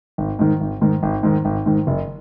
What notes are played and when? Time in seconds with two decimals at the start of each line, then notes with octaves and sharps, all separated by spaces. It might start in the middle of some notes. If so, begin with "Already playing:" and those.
0.18 G#1
0.39 G#2 D#3
0.61 G#1
0.81 G#2 D#3
1.03 G#1
1.23 G#2 D#3
1.45 G#1
1.66 G#2 D#3
1.87 F#1